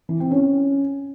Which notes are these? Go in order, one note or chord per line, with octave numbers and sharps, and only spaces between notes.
E3
C4
C#4